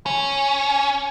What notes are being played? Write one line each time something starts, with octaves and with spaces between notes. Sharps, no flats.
C#4